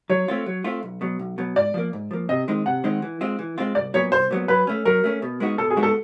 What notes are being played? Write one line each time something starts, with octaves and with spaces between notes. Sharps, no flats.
F#3 C#5
A3 C4 F4
F#3
A3 C4 F4
B1
B2 F#3
B1
B2 F#3
G#2 D5
F3 A#3
G#2
F3 A#3
C3 D#5
D#3 G#3 C4 D#4
C3 F#5
D#3 G#3 C4 D#4
E3
G#3 C4 F4
E3
G#3 C4 F4
C2 D5
A#2 F#3 B3 C#5
C2 C5
A#2 F#3 B3
F#3 B4
A3 C#4
F#3 A#4
A3 C#4
B2
G#3 B3 D#4 F#4
B2 A4
G#4
G#3 B3 D#4 F#4
A4